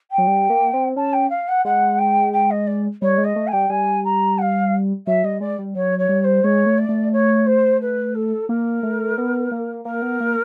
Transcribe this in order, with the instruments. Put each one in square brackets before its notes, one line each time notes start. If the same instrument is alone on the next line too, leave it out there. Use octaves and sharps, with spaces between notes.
[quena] G5
[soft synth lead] F#3
G3
A#3
C4
[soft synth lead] C#4 [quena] A5
[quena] G5
F5
F#5
[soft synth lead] G#3 [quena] F#5
[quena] G5
G5
D#5
D5
[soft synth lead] G3 [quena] C#5
[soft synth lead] G#3
[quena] D#5
[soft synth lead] A3
[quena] G#5
[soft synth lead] G3 [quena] G5
[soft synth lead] G3 [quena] G#5
[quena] A#5
F#5
F5
[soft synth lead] F#3 [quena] E5
[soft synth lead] G3 [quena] D#5
[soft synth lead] G#3 [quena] D5
[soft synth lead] G3
[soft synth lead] F#3 [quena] C#5
[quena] C#5
[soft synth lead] G3
[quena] C#5
C5
[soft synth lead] G#3 [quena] C#5
[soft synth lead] A3
[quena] D5
[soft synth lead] A3
[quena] C#5
C5
B4
A4
[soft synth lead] A#3 [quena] A#4
[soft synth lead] A3
B3
A#3
[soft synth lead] A#3 [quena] A#4
[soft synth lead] B3
A#3